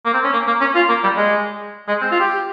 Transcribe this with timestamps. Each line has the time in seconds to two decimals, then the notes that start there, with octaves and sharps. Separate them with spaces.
0.05 A#3
0.14 C4
0.24 C#4
0.33 A#3
0.47 A#3
0.60 C#4
0.75 F4
0.89 A#3
1.03 G3
1.17 G#3
1.88 G#3
2.01 C4
2.11 F4
2.20 G4